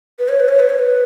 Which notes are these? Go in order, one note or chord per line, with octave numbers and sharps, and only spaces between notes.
B4
C#5
B4
C#5
B4
C#5
B4